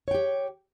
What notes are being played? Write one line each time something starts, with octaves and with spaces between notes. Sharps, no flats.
G4 C#5 G5